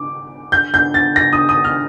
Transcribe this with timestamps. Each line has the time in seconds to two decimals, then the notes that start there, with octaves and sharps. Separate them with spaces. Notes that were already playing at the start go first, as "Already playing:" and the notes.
Already playing: D6
0.52 G6
0.74 G6
0.94 A6
1.16 A#6
1.33 D#6
1.49 D#6
1.64 F6